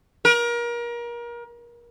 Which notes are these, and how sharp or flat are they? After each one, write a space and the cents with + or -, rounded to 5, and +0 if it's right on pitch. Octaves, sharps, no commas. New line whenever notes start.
A#4 +30